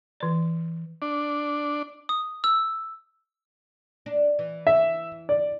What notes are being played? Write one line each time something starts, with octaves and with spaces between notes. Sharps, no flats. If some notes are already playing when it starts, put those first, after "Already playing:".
E3 D5
D4
D#6
E6
D4
E3
E5
D5